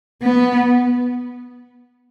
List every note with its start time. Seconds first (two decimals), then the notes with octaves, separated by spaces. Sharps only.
0.23 B3